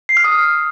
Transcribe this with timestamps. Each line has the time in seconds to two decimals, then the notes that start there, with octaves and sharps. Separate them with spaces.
0.09 C7
0.17 F6
0.24 D#6